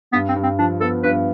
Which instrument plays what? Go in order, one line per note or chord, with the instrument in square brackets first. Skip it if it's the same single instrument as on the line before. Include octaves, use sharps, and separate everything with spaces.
[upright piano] G2 [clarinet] B3
[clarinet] C4
[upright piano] G2
[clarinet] C4
[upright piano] F3 [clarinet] D4
[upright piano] B3 [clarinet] A4
[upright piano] G2 [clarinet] B4